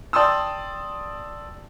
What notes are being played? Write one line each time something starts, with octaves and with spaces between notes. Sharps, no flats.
D5 G5 A5 C6 D#6 E6